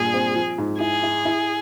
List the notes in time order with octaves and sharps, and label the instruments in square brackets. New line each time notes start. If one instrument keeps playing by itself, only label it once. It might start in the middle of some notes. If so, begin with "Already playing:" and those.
Already playing: [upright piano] G2 A#2 [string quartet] G#4
[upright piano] C4
F3
G#2
[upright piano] E4 [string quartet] G#4
[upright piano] E4
E4